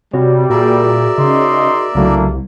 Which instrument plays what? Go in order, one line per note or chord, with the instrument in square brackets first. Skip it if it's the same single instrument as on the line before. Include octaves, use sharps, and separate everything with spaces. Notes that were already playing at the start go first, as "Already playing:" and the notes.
[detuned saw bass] C3 [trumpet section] G3 [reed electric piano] C4 F#4 C#5
[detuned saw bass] A#2 [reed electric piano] F#4 G#4 [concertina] A#4 D5 E5
[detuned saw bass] C#3 [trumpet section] D#4 D#5 C6
[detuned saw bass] C2 [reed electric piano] C#3 F#3 A3 [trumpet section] A#3 D4 E4